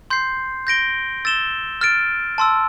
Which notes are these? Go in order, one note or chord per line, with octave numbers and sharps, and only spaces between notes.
C6 G6 C7
G6 A#6 D7 G7
E6 A6 E7 G7
F6 A6 D7
A5 C6 E6